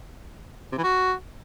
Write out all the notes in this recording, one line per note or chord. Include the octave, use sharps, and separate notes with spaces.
C3
E3
F#4